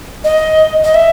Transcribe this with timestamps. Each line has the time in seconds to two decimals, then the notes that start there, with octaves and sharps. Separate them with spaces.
0.24 D#5
0.84 D#5
0.94 E5